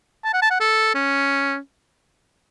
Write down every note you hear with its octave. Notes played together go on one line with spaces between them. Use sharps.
A5
F#5
A5
F#5
A4
C#4